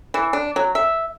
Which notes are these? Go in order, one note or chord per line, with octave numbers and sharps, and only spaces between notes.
E3
D4
F#3
E5